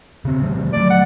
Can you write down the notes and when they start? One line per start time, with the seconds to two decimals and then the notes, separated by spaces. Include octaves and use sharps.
0.25 C#3 C4
0.41 D3 F3 G3
0.73 F#3 A3 D5
0.90 F#5